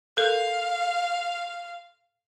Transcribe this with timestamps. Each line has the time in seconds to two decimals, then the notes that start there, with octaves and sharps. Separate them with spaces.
0.17 A4 A#4 F5